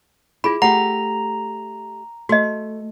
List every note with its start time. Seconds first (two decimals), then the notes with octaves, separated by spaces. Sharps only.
0.44 E4 F4 G#4 B5
0.62 A3 G4 F#5 A#5
2.29 A3 F#4 D#5